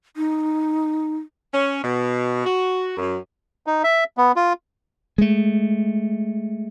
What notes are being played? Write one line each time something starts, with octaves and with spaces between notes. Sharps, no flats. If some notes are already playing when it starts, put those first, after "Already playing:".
D#4
C#4
B2
F#4
F#2
D#4
E5
B3
F4
G#3 A3